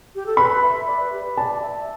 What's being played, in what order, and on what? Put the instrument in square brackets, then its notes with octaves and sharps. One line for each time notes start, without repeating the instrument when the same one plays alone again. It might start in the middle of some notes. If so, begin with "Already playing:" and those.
[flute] G4
A4
[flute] B4 [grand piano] B5
[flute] E5
D5
B4
G4
B4
[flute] D5 [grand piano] A5
[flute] E5